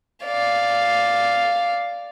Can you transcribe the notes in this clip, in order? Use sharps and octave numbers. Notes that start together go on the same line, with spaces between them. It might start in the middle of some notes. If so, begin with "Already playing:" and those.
D5 F5